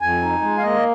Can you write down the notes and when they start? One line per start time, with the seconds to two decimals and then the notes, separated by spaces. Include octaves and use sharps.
0.01 F2 G#5
0.22 D#4
0.42 G#3
0.58 F5
0.62 A#3 D#5